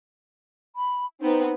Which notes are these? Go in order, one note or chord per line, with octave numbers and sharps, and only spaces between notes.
B5
B3 C4 D#4